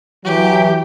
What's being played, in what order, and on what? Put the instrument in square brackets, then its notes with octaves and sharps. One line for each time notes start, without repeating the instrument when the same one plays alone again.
[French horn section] E3 F#3 [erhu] G4